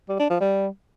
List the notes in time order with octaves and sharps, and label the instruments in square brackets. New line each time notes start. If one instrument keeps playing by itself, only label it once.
[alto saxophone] G3
D4
F3
G3